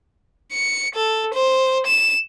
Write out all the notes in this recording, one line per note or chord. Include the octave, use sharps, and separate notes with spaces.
C#7
A4
C5
E7